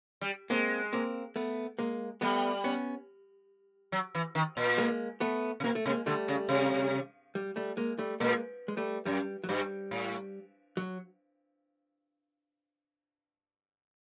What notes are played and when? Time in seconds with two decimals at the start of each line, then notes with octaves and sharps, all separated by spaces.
0.21 G3
0.50 G#3 A#3 C4
0.93 A#3 C4
1.36 A3 B3
1.79 G#3 A#3
2.21 G3 A3 B3
2.64 B3 C#4
3.92 F#3
4.15 E3
4.35 D#3
4.57 A#2
4.78 G#3 A#3
5.20 A3 B3
5.60 C3
5.64 B2 A#3
5.75 A3
5.86 C3 G#3 A#3
6.06 D3 G3 A3
6.28 C#3
6.49 C3
7.35 G3
7.56 G3 A3
7.77 G#3 A#3
7.99 G3 A3
8.20 A#2 G#3 A#3
8.68 G#3
8.77 G3 A3
9.05 F#2 G3
9.44 F#3
9.49 G2 G3
9.91 A2
10.77 F#3